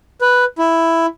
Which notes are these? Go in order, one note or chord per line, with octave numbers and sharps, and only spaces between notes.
B4
E4